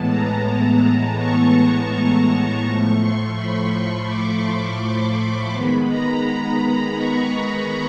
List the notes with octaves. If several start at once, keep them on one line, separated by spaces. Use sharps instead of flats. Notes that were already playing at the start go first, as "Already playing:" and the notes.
Already playing: A2 E3 G#3 B3 A5
A#5
C#6
A2 F3 A3 C#6
C6
B5
B5
D6
C#6
C6
B5
D#3 G#3 B3 B5
A#5
A#5
B5
C#6
B5